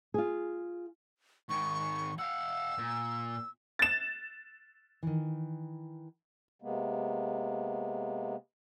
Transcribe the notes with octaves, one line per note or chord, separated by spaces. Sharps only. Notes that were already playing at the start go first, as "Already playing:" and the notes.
F4 G#4
G#2 D#3 C#6
F5 F#5 E6
A#2
A6 E7
D#3 E3
C3 G#3 A#3 B3